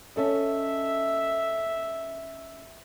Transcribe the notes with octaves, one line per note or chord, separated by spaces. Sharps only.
C#4 A4 D#5 E5